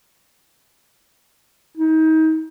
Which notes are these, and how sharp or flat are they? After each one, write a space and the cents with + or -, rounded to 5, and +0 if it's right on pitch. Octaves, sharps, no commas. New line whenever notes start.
D#4 +30